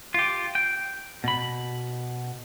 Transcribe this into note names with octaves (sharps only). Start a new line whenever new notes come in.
F4 G4
G5
B2 B5